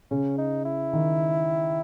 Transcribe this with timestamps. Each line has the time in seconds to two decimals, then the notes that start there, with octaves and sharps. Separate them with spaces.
0.11 C#3 C#4
0.38 D#4
0.65 E4
0.93 D#3